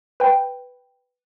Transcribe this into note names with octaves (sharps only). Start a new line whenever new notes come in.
B4 G5